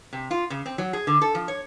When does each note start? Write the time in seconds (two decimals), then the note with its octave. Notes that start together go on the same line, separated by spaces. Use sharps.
0.13 C3
0.31 F4
0.50 C#3
0.66 C4
0.78 F#3
0.93 G#4
1.07 D3
1.21 A4
1.35 F3
1.48 C#5